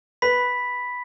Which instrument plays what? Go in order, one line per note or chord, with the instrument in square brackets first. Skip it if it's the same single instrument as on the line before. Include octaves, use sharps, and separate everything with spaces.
[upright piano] B4 [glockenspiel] B5 B6